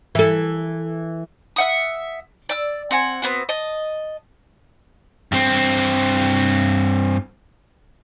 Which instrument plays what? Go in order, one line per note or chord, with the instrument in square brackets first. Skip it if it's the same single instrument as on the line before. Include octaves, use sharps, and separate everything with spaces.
[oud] E3 A4
[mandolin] E5 F#5 D#6
D5 E6
C4 F#5 G#5
B3 C4 F#4
D#5 A5
[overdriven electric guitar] G2 C4